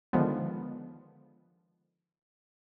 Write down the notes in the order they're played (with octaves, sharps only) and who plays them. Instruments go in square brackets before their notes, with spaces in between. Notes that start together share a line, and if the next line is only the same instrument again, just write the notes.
[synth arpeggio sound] D3 D#3 F3 G#3 B3